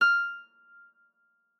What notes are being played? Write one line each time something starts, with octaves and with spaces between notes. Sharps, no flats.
F6